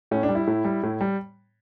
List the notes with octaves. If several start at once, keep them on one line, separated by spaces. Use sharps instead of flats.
A2 C#4
D4
G3
E4
A2
G3
A2
G3